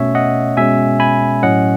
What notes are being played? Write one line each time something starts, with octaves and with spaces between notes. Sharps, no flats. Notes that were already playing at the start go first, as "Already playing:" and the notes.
Already playing: B2 A3 C#4 C#5 E5
D#5 F#5
B2 G#3 C#4 E5 G#5
G#5 B5
A2 F#3 C#4 D#5 F#5